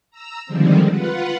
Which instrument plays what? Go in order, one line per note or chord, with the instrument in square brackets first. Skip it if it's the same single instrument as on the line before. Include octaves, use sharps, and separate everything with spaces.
[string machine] A#5 E6
D3 D#3 F3 G3 G#3 C4
F4 B4 F#5